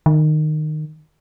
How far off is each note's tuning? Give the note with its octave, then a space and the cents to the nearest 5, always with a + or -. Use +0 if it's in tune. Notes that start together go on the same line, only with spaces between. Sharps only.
D#3 -20